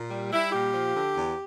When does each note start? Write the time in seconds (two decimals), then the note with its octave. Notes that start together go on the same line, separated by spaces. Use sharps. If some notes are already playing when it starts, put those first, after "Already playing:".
Already playing: A#2
0.09 G3
0.31 G3 E4
0.52 A#2 G4
0.73 F3
0.94 D3
1.15 E2